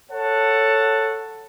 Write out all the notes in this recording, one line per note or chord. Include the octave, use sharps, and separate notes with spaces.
A4 C#5 F#5 A5